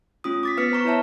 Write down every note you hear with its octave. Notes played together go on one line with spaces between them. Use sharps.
A3 C#4 F4 D#6
D6 A6 B6
B3 B4 F5 F6 B6 C#7
C5 A#5 C#6
E4 B4 C#5 E5 A5 A#5